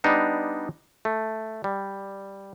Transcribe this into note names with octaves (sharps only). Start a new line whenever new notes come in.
G3 B3 D4 D#4
A3
G3